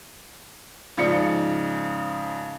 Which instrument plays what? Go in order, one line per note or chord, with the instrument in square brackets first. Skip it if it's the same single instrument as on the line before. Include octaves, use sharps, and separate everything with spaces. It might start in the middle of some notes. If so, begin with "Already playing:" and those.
[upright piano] G#2 C#3 F3 D5 C#7